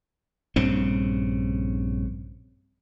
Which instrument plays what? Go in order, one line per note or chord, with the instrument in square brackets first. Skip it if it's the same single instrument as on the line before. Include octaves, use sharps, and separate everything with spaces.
[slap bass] A#1 G2 C#3 C4